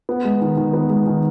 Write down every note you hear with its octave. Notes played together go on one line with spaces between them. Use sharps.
B3
G#3
D#3
D#3
B3
G#3
D#3